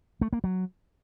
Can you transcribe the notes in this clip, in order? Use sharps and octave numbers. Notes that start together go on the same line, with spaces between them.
A3
A#3
F#3